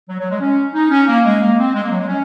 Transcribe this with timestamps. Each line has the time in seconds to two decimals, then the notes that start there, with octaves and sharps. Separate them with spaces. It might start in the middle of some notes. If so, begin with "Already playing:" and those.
0.09 F#3
0.20 F#3
0.30 G#3
0.41 C#4
0.74 D#4
0.91 C#4
1.08 A#3
1.25 G#3
1.41 A#3
1.58 C4
1.75 G#3
1.84 A#3
1.91 F#3
2.01 G#3
2.08 C#4